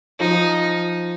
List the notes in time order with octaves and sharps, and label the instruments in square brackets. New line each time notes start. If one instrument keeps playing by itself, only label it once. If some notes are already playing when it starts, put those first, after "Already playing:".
[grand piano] F3 [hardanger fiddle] D#4